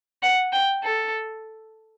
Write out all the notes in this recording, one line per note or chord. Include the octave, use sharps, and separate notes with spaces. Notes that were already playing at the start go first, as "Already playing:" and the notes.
F#5
G5
A4